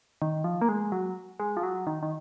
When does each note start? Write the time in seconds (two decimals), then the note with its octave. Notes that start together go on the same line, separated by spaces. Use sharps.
0.22 D#3
0.44 F3
0.61 A#3
0.69 G#3
0.92 F#3
1.40 G#3
1.57 F3
1.63 F#3
1.87 D#3
2.03 D#3